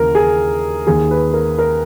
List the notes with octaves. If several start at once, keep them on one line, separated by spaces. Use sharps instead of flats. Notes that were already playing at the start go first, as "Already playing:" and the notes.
Already playing: D#2 C#3 E3 A#4
G#4
D#2 D#3 G#4
B4
A#4
A#4